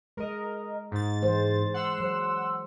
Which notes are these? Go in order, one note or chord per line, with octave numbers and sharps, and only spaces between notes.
G#3 A#4 D#5
G#2 A6
E3 G#3 C5
F#5 C6 E6
F#3 C5